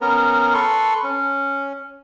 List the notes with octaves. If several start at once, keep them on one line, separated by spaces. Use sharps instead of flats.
B3 C#4 A#4
A4 B4 C6 C#6
C#4